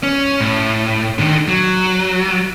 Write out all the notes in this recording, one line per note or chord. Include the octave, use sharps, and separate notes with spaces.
C#4
A2
D3 D#3
F#3